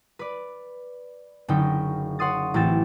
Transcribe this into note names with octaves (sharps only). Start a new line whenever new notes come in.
B4 D5
F#1 D3 C#4 D#4 G5
C#5 F#5 C6 D#6 A6
A1 E3 C4 G5 A6 E7